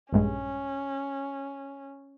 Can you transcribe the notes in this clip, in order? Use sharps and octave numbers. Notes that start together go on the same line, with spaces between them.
A#1 G2 G#3 C#4